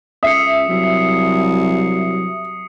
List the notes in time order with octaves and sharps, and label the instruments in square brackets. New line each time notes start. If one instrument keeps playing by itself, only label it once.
[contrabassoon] C#2 [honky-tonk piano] E5 [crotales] D#6 C7 C#7
[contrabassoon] C2 [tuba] F#3